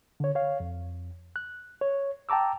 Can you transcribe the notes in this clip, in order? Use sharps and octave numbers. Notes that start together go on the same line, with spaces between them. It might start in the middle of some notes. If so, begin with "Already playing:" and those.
D3 C#5
C#5 F5
F2
F#6
C#5
G5 A5 A#5 D6 E6